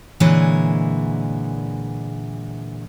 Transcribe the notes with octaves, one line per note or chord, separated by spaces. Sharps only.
A#2 D3 E3 G#3 C#5